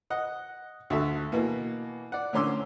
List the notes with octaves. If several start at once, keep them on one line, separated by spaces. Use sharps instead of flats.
D#5 F#5
D2 F#4 A4 E5
B2 E3 A#3
D5 F#5
A2 D3 C#4 C6 D6 E6